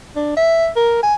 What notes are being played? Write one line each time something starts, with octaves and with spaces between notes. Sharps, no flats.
D4
E5
A#4
G#5